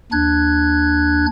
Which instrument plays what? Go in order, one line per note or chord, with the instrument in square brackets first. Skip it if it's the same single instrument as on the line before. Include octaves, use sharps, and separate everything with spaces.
[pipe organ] D#2 D4 F#6 G#6